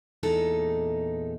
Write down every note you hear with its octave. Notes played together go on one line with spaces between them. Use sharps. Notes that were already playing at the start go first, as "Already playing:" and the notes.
E2 A#2 G#3 D#4 A4